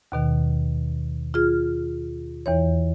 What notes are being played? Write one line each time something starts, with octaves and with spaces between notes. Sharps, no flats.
D#2 B2 D#3
F4 G#4 F6
E2 E3 C#5